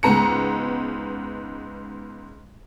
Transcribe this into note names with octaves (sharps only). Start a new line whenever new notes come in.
C#2 G#2 B3 A#5 C#7